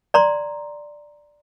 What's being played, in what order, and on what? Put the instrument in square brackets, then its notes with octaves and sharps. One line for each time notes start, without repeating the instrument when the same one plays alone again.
[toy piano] D5 A#5 C6